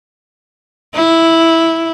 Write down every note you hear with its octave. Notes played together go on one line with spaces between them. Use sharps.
E4